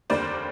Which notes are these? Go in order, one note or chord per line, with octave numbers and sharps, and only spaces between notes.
F1 D#2 D3 G3 A#3 C5 D5